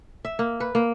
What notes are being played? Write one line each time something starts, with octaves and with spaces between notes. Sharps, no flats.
E5
A#3
B4
A#3